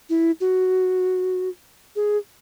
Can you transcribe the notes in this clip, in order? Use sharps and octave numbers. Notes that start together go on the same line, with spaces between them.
E4
F#4
G#4